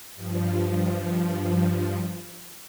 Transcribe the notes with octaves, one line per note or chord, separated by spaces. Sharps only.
G2 F3